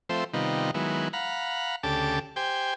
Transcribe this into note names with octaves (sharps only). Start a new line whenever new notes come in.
F3 A3 C4 C5 E5
C3 D#3 G3 B3 D#4 F4
D#3 F#3 G#3 B3 E4
F5 F#5 A#5 B5
D2 C#3 G4 A4 A5 D6
G4 C5 G5 G#5